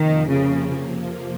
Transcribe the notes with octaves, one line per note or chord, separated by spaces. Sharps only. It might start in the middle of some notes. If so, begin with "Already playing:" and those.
Already playing: F2 C3 D#3 F3 A#3
C#3